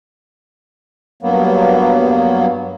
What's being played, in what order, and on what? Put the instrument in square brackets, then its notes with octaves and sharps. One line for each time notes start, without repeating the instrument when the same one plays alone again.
[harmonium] G2 F#3 A#3 B3